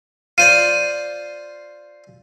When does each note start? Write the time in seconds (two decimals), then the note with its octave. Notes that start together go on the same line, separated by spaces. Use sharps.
0.38 F4 C5 D5 D#7